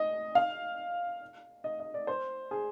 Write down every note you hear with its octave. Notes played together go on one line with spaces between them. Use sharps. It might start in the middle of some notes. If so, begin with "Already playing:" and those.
Already playing: D#5
F5
D#5
D#5
D5
C5
G#4